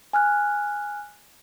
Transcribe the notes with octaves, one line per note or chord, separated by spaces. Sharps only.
G#5 F6 F#6